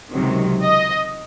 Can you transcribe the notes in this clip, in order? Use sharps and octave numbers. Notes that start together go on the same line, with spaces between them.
C#2 C3 D#3 F#3
D#5